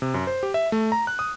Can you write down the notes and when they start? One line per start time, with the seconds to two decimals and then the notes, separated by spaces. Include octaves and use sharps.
0.02 C3
0.14 F#2
0.27 C5
0.43 G4
0.54 E5
0.72 A3
0.92 A#5
1.07 F#6
1.19 D#6